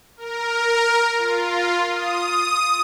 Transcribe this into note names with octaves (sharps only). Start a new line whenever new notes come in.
A#4
F4
D#6